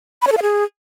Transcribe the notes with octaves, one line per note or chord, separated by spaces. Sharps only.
B5
C#5
A4
F5
G#4